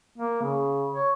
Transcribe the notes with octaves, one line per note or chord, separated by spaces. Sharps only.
A#3
C#3
C#5